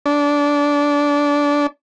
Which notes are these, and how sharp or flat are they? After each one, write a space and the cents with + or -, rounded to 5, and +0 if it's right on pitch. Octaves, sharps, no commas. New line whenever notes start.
D4 -20